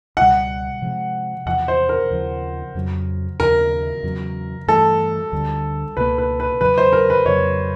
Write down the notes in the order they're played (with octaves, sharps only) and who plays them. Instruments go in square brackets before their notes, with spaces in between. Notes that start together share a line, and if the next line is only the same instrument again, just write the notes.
[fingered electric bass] C#2 B2 G3 [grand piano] F#5
[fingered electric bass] C3 F3 G#3
[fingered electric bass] E2 C3 F3 [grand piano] F#5
[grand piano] C5
A#4
[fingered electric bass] D#2 C#3 F3
F2 C#3 F#3
[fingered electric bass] D#2 C#3 F3 [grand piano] A#4
[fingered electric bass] E2 C#3 F#3
[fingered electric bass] G2 E3 A3 [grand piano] A4
[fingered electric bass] D2 D3 G3
[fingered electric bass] C#2 B2 F#3 A#3 [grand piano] B4
[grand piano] B4
B4
[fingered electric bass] E2 C#3 F#3 [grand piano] B4
[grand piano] C5
A#4
B4
[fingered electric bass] F2 C#3 F#3 [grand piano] C#5